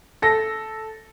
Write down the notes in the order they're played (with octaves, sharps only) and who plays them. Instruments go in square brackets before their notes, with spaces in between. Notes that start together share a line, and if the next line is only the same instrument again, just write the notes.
[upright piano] A4 A#6